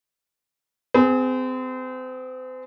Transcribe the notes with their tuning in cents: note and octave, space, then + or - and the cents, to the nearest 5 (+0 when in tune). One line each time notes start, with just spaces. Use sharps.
C4 -35 G#4 +0